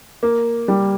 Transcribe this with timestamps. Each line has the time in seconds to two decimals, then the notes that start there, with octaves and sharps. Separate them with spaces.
0.23 A#3
0.68 G3